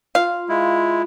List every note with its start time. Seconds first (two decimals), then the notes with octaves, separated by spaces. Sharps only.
0.15 F4 F5
0.49 G#3 E4